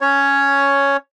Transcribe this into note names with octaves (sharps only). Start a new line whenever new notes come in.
C#4 C#5